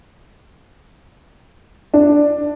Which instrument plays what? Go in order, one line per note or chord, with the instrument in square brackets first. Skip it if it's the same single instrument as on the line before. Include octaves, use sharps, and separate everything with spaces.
[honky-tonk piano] D4